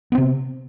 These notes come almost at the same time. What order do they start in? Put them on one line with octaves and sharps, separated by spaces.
B3 C4 C3